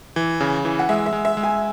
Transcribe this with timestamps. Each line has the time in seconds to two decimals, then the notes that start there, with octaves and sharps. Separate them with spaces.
0.16 E3
0.41 C#3
0.65 E3
0.79 F#5
0.89 G#3 E5
1.06 E5
1.13 G#3
1.25 E5
1.37 G#3
1.43 G#5